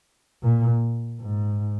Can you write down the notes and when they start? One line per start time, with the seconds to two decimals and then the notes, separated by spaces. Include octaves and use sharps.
0.42 A#2
1.20 G#2